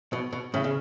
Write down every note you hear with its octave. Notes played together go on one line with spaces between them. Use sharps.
B2
B2
A2 C#3
C#3